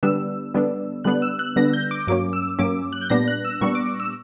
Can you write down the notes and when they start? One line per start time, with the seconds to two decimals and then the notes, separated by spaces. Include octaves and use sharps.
0.03 D3 G3 B3 D4 E6
0.54 D3 G3 B3 D4
1.04 D3 G3 B3 D4 F#6
1.22 E6
1.39 F#6
1.56 D3 G3 B3 D4 A#6
1.73 G6
1.91 D6
2.07 G2 F#3 A#3 C#4 D6
2.33 E6
2.59 G2 F#3 A#3 C#4 D6
2.93 F#6
3.01 G6
3.10 A#2 G3 B3 D4 A#6
3.28 F#6
3.45 E6
3.61 A#2 G3 B3 D4 C#6
3.75 D6
4.00 E6